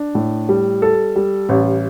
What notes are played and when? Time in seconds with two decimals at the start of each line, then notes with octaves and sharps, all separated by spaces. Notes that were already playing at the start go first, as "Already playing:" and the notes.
Already playing: D4
0.15 A2
0.49 G3
0.82 A4
1.16 G3
1.49 A1